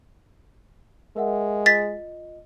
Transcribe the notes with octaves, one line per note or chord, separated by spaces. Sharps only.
G#3 A#4 E5 F#5
F4 D#5 A6 B6